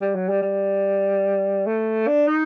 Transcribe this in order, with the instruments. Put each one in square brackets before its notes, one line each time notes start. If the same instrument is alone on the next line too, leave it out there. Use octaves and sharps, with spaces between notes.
[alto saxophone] G3
F#3
G3
G3
A3
D4
D#4